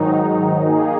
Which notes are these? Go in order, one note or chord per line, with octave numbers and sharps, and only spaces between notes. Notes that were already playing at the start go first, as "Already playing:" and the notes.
Already playing: G#2 D#3 F#3 D#4
D#3 A#3 D#4 G#4